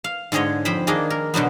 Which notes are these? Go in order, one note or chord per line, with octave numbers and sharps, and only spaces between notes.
F5
G#2 D3 G#4 C#5 D#5
F2 C5 G5 B5
D#3 A#3 D4 G#4 D#5
A#4
B2 D3 F#3 B3